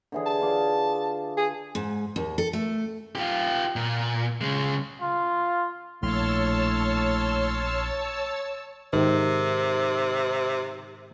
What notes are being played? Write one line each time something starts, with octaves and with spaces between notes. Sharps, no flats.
D3 E3 G#4
A5
F4 D5
G#4
G#2
D#2
A4
A3
F4 G4
A#2
C#3 G#3
F4
A#1 A2 C#5 A5 C6 E6 F6
G#2 C3 D#3